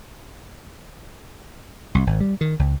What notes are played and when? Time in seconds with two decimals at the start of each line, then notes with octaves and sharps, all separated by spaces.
1.95 C2
2.07 G#1
2.20 G3
2.41 D#3
2.59 C#2